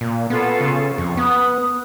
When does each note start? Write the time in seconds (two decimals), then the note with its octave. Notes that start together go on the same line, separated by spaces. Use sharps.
0.01 A#2
0.30 B3 C#4 F4 A4
0.61 C#3
0.98 F2 C#6
1.17 B3 D#6 F#6